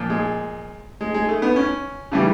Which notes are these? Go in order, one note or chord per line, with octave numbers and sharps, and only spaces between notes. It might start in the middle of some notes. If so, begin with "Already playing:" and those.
Already playing: A#2 F3
G#3
G#3
G#3
A3
B3
C#4
C#3 E3 G3